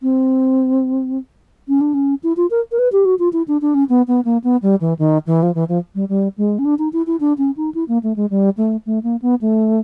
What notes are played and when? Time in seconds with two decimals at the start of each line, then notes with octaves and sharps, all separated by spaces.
0.02 C4
1.68 C#4
1.81 D4
1.94 C#4
2.23 E4
2.37 F4
2.50 A#4
2.71 A#4
2.79 B4
2.92 G4
3.05 F#4
3.19 F4
3.33 E4
3.48 D4
3.61 D4
3.74 C#4
3.89 B3
4.08 B3
4.25 A#3
4.44 B3
4.62 G3
4.81 E3
4.99 D#3
5.27 E3
5.43 F3
5.55 E3
5.69 F3
5.95 G3
6.09 G3
6.38 G#3
6.59 C#4
6.65 D4
6.79 D#4
6.93 E4
7.07 E4
7.20 D4
7.38 C#4
7.57 D#4
7.74 E4
7.88 A#3
8.03 A3
8.16 G#3
8.30 G3
8.57 A3
8.86 A3
9.03 A#3
9.22 B3
9.41 A3